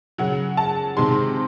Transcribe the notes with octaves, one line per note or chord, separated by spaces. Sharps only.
C#3 F#3 F#5
A5
C3 D#3 G#3 C6